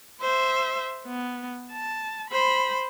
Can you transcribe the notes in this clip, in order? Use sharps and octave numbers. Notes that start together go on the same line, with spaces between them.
C5 E5
B3
A5
C5 B5